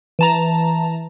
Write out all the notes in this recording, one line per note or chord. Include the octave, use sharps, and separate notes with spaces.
E3 A5 A#5